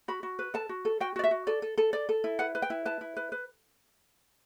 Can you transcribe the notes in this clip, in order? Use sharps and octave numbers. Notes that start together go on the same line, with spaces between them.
F#4 B5
F#4
B4
A4 A5
F#4
A4
F#4 G5
F#4 D5
E5
F#4
A4 D5
A4
A4
A4 D5
A4
E4
B4 F#5
B4
G5
E4
B4 A5
E4
B4
B4